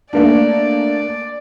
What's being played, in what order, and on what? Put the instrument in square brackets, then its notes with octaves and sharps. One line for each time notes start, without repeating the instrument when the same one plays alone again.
[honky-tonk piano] A3 A#3 D4 [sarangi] D5